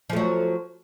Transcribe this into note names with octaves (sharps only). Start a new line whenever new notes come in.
F3 F#3 A3